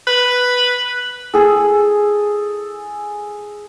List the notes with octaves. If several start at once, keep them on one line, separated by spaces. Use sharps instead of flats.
B4
G#4 A4